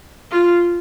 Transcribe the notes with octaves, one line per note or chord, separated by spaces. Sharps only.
F4